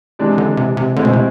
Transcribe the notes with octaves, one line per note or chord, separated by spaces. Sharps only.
C3 E3 G#3 D4
D3
C3
C3
A2 D3 G#3 C4 E4
B2
C3